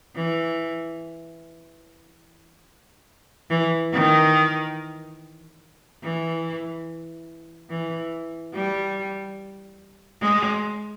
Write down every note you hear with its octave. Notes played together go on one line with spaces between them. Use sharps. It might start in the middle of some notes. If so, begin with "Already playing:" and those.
E3
E3
D#3
E3
E3
G3
G#3